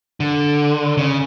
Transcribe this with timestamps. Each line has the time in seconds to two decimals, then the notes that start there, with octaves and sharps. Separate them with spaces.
0.20 D3
0.97 C#3